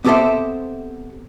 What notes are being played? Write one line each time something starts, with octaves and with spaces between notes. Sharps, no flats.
B3 C4 G4 A4 C5 E5